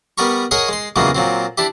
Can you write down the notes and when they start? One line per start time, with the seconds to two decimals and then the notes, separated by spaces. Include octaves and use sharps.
0.18 G3 B3 A#4 A#5 C#6
0.51 G#4 A#4 C#5 D#5 F#5 C#6
0.68 G#3 C6
0.96 E2 A#2 C#3 F#3 G#3 A#3
1.15 A#2 F#3 C4
1.58 D4 E4 G4